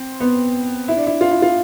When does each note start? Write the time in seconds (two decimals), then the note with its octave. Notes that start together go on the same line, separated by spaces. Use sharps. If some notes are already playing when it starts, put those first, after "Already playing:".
Already playing: C4
0.20 B3
0.88 E4
0.97 D4
1.07 E4
1.21 F4
1.31 E4
1.42 F4